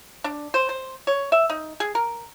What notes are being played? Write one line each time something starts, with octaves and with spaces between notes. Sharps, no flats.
D4
C5
C5
C#5
E5
D#4
G#4
A#4